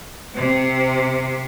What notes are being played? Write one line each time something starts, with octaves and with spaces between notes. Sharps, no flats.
C3 C4